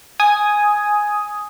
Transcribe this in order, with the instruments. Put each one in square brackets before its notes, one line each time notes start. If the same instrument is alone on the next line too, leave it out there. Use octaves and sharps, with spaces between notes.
[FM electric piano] G#5 D#6